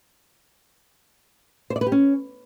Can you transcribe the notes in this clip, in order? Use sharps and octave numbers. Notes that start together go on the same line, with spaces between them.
C5
D5
B4
G4
C#4